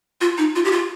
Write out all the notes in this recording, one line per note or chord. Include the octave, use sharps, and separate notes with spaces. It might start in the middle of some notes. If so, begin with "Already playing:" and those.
F4
D#4
F4
G4
F4